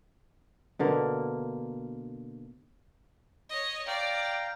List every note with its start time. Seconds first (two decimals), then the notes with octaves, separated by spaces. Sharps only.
0.79 B2 D3 A#3
3.50 C#5 D#5
3.87 D5 F5 G5 A#5